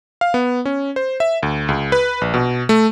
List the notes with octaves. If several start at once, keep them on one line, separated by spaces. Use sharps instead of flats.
F5
B3
C#4
C5
E5
D2
C#2
B4
A#1
B2
A3